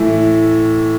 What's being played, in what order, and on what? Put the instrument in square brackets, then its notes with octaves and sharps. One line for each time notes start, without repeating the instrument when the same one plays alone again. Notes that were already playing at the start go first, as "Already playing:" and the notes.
Already playing: [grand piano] A2 E3